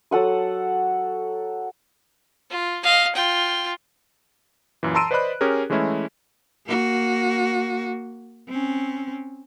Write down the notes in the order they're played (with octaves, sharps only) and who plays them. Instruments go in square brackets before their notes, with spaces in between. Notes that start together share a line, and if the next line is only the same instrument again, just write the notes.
[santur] F#3 A4 F#5 D#6
[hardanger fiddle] F4
D#5 F5
F4 G5
[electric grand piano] F#2 A#2 E3
A5 A#5 C6 E6 D7 D#7
B4 C5 D5 D#5 B5 F#6
C#4 G4 G#4 A#4
E3 G#3 A3 C#4 E4
[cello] A#3 F#4
C4 C#4